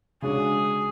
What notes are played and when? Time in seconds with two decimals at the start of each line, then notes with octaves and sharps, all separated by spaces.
0.22 C#3 G#3 D4 F#4 G#4 C#5